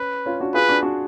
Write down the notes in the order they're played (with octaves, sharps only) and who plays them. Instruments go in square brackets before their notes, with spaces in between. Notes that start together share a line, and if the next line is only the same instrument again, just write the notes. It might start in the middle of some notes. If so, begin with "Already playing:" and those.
Already playing: [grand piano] C#4 [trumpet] B4
[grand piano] C#4 F4
D4 F#4
[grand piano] F4 G#4 [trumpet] B4
[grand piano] D4 F#4
D4 F#4